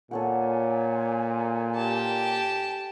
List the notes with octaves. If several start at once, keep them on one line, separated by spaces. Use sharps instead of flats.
A#2 A4 C#5 F#5 G#5
G4 A5